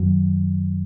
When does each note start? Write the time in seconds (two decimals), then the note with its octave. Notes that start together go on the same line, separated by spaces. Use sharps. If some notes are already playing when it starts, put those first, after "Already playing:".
Already playing: F#2 D#3 F#3